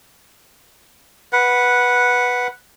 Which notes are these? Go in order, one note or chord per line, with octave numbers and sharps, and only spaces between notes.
B4 F#5